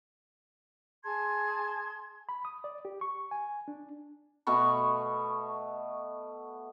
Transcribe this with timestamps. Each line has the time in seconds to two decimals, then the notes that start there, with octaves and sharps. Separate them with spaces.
1.03 G#4 A5 C6 G#6
2.29 B5
2.45 D#6
2.64 D5
2.85 G4
3.01 C#6
3.31 G#5
3.68 D4
4.47 B2 A3 B3 C#6